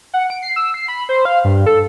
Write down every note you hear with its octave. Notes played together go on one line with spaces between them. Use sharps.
F#5
D7
C7
E6
C7
B5
C5
F5
G2
A4